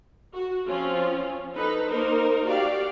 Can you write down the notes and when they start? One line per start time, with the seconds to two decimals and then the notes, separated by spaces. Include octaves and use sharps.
0.34 F#4
0.67 F3 C4 C#4 F4
1.54 D#4 A4 B4
1.89 A#3 D#4 A#4 C5
2.46 F#4 G4 D5 F5